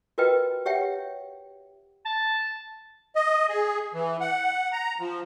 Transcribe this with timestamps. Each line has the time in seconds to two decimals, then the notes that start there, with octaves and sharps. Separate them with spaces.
0.18 F4 F#4 A#4 B4 D#5 G5
0.66 G4 C#5 E5 F#5 G5
2.05 A5
3.15 D#5
3.49 G#4
3.94 E3
4.21 F#5
4.72 A#5
5.00 F3